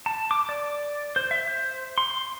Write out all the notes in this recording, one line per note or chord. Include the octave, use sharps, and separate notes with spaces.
A5
D6
D5
C5
E5
C5
C6